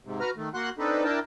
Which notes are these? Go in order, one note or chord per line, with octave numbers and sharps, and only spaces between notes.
G#2 C3
F#4 B4 A#5 F6
D#3 A3
A#3 F#4 F#5 C6 F#6
C4 D4 D#4 A4 B4
D4 E4 A#4 G5 A5